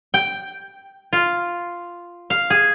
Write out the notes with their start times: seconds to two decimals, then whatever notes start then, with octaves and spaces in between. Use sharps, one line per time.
0.14 G5
1.13 F4
2.30 F5
2.50 G#4